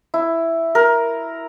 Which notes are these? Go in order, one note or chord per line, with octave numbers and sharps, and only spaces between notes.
E4
A#4